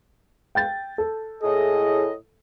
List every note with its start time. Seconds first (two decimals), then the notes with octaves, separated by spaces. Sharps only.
0.55 G5 G6 A6
0.98 A4
1.43 A2 G#4 D#5